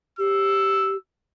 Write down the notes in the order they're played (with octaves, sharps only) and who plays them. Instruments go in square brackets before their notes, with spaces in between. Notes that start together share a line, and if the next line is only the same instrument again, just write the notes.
[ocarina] G4 [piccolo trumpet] E6